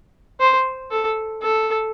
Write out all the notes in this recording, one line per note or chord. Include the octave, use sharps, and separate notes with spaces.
C5
A4
A4